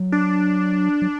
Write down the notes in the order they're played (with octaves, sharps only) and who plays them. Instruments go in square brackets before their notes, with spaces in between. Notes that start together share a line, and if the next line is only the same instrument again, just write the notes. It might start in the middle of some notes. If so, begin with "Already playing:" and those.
Already playing: [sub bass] F#3
[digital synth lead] D4
[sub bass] F#3